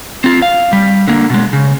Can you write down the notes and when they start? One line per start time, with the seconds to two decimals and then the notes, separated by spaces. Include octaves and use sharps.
0.24 C4 F4
0.42 F5
0.73 G3
1.08 D3 A#3
1.30 B2 G#3
1.53 C#3